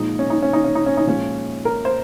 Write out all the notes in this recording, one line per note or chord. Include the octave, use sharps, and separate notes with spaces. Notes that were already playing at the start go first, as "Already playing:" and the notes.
Already playing: A#2 F3 G#3 D#4
C#4
D#4
C#4
D#4
C#4
D#4
C#4
D#4
A#2 F3 G#3 C#4
A#4
C5